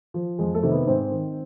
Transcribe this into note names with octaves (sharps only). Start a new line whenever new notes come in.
F3
F2 G#3 G#4
A3 A4
C3 D#3
B3 B4
G#2 C4 C5
D#3